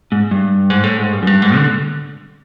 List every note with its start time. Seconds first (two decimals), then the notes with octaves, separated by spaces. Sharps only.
0.12 G#2
0.31 G2
0.70 G#2
0.84 A2
0.98 G#2
1.13 G2
1.23 F#2
1.27 G2
1.42 G#2
1.56 D3